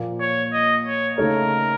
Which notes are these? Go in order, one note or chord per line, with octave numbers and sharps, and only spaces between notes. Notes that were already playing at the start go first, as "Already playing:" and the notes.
Already playing: A#2 F3 A#3
C#5
D#5
C#5
C#3 A3 D#4 A4 A#4 C#5